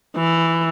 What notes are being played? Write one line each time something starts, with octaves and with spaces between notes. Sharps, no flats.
E3